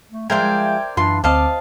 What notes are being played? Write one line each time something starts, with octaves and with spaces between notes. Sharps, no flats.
A3
F3 G#3 A#4 C5 D5 E5 G5 G#6
F#2 E3 D4 F4 B4 C6
D2 C4 C5 D#5 F5 A5 D6